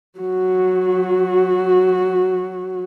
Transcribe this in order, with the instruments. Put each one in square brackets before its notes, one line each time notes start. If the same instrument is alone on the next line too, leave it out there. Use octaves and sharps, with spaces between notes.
[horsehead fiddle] F#3 F#4